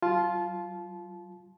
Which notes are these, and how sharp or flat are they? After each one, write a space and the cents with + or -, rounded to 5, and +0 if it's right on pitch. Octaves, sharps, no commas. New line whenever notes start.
F#3 +40 F4 +0 A5 -25